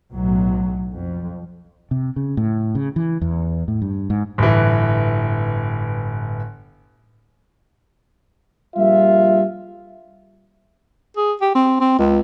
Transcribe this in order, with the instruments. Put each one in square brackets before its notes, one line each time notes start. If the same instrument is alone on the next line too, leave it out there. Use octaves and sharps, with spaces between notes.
[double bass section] B1 A2 F#3
F2
[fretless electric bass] C3
C#3
A2
C#3
E3
E2
A2
G2
G#2
[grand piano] G1 E3 [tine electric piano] A2
[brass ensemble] A#1 G3 F4 E5
[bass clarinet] G#4
G4
C4
C4
C#2